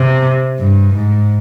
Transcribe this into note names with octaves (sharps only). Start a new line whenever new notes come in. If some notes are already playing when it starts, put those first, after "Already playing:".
Already playing: C3
G2
G#2